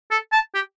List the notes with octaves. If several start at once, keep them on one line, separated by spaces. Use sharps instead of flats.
A4
A5
G4